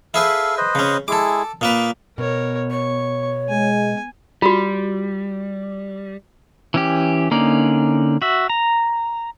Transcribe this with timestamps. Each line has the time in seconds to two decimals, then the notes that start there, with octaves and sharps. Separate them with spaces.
0.14 E4 G#4 A4 B4 F5
0.57 B4 C5 D#5
0.75 C#3 C#4
1.08 G#3 E4 G#4 A4 D6
1.61 A#2 A#3 B4 D#6
2.18 B2 A#4 C#5
2.71 C#5 C#6
3.49 G#3 G#5
4.42 G3 F4 F#4
6.74 E3 C#4 G4
7.31 D3 A#3 C#4 D#4 D5
8.22 F#4 E5
8.50 A#5